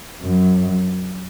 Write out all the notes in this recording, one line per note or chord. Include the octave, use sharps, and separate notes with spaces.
F#2